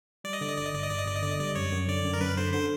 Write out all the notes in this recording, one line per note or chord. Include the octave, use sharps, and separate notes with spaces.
G3 D5
D#5
D3 D5
D#5
G1 D5
D#5
G1 D5
D#5
G1 D5
D#5
G1 D5
D#5
D3 D5
D#5
G3 D5
F#2 C#5
F#2
D3 D5
F#2
A#4
F#2 B4
D3 C5
D3 C5